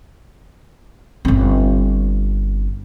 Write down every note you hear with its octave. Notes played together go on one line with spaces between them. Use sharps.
G1 C4